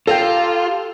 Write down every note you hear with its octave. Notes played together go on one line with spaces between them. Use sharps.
F4 G4 A4 F5 A#5